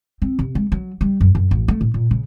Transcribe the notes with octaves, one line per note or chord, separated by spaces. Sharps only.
C4
C3
G#3
F#3
G3
F#2
F#2
A1
A3
A2
A#2
C#3